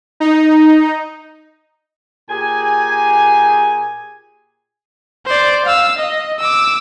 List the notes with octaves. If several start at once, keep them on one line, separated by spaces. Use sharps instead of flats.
D#4
A#2 G4 G#4 G#5
C5 D5
F5 E6
D#5
D6 E6